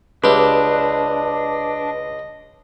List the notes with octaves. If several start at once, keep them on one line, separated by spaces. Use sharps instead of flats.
C#2 D4 G4 B4 D#5